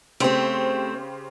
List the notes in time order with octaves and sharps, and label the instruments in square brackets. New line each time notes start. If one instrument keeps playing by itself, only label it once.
[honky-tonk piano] C#3 G4 C5 [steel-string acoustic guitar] A3 C4